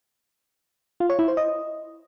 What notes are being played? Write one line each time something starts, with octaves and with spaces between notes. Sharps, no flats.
F4
C#5
E4
C5
D#5